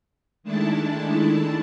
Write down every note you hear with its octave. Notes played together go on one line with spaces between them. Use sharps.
D#3 G#3 A3 D4 E4 A5